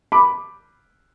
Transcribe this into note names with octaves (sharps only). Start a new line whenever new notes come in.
B5 D6